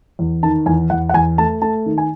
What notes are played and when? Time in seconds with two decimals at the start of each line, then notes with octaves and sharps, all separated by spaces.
0.19 E2
0.43 D#3 A5
0.66 E2 G#5
0.90 E2 F#5
1.09 F#5
1.14 E2 G#5
1.38 A3 A5
1.62 A3 A5
1.86 D#3
1.98 G#5